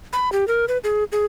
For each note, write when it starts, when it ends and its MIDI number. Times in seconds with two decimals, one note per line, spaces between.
0.13 0.32 83
0.32 0.47 67
0.48 0.65 70
0.68 0.78 71
0.84 1.04 68
1.12 1.25 68